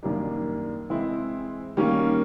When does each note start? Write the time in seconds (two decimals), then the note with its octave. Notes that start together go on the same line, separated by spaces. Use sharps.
0.03 F#2 D#3 G3 A#3 D4
0.90 E3 G#3 C4 E4
1.77 D#3 G3 A#3 C#4